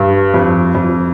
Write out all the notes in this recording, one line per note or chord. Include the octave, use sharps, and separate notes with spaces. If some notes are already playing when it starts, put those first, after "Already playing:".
Already playing: G2
F2
F2